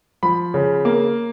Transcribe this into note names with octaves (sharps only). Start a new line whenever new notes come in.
F3 B5
C#3
A#3